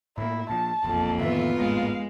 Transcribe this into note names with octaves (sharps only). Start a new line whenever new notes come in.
A2 A#3 E4
A#2 F3 A5
E1 A#1 F2 A#3
A2 D#3 E3 B3 F4 E5
G#1 A2 G#3 A#3 F5